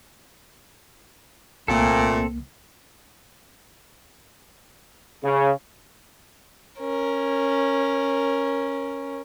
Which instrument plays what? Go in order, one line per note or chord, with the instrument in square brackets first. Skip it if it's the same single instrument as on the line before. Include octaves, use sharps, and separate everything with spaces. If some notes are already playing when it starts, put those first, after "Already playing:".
[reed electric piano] C2 A#3 [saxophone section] A#2 [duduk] A3 [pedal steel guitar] C4 A4
[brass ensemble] C#3
[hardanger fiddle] C#4 A#4